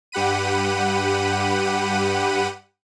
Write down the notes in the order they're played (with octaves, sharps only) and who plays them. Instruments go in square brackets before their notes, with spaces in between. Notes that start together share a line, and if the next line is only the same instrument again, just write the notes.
[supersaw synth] G2 G4 F#5 B5 D#7